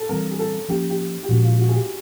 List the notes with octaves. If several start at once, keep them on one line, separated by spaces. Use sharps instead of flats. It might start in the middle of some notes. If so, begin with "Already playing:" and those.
Already playing: A4
E3 G3 C4 A#4
G#4
A4
F3 A#3 C#4 G4
G4
G4
A#2 F3 G#3 C#4 F#4
F4
F#4
G#4
G4